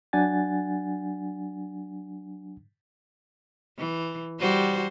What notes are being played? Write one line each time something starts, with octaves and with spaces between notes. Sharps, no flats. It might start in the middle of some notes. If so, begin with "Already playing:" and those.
F#3 D4 F#5 G#5 A6
E3
G3 F#4 C5